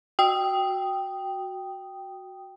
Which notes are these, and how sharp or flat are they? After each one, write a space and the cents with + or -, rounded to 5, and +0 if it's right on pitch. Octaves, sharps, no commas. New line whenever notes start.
F#4 +0 G5 +0 D#6 +0